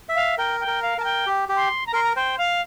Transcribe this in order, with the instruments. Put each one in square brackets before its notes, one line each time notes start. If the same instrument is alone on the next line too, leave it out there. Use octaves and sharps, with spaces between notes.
[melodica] E5
[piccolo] F5
[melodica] A#4 [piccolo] G5
[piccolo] G5
[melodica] A#4
[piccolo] F5
[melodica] A#4 [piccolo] A5
[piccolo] G5
[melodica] G4
G4
[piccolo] C6
A#5
[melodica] A#4 [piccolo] C6
[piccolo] A#5
[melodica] C5 [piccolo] G5
[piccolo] F5